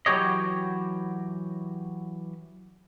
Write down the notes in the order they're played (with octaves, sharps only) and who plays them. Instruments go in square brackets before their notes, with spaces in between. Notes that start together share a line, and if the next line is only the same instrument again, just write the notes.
[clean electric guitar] E3 F#3 F#4 G4 C#5 D#5